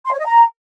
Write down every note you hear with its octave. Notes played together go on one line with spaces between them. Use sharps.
C6
C#5
D#5
A#5